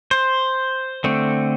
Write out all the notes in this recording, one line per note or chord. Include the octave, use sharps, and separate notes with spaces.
C5
D3 A3 C4